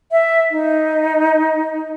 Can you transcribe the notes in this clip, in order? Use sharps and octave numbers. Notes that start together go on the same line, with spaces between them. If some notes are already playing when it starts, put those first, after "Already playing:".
E5
D#4